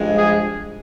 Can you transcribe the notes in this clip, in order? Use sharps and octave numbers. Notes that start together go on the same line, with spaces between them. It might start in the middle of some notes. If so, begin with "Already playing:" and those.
Already playing: G2 F3 G#3
G#4